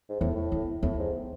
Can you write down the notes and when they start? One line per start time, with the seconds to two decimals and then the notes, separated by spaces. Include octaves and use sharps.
0.09 G#2
0.20 E2 A2
0.36 A2
0.52 E2
0.83 E2 A2
0.98 G#2